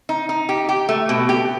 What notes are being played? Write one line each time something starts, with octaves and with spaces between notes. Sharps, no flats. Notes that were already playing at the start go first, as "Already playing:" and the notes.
D#4
D#4
G4
G4
A3
B2
G4